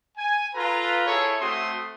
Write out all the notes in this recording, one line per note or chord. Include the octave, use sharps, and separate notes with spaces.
G#5
F4 A4 B4 A#5
E4 G#4 A4 C#5
A3 C4 F#4 C6 D#6